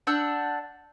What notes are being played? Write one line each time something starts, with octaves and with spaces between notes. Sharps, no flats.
D4 F#5 E6 G6